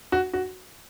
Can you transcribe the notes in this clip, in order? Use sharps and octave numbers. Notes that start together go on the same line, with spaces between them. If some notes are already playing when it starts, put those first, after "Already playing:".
F#4
F#4